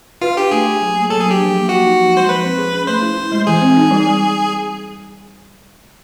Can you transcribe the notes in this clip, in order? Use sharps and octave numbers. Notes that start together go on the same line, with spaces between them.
F4 B4
D4 G4
A3 G#4
G4
F#3
A#3
F#3 A4
G#4
D4
G4
F3
A#3
F3 F#4
D#4
F3
G#3 C5
F3 B4
C4
G#4
C#4
A3 C5
E4
E4
G#3
E3 G#4
C4
D#4
G3